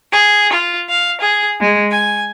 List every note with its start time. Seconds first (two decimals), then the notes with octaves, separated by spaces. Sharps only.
0.11 G#4
0.52 F4
0.88 F5
1.19 G#4
1.59 G#3
1.90 G#5